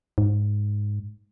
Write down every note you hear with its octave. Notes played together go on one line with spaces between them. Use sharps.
G#2